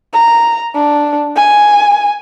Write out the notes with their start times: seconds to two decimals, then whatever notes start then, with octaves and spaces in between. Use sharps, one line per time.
0.13 A#5
0.75 D4
1.36 G#5